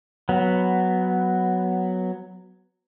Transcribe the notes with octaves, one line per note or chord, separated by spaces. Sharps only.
F#3 B3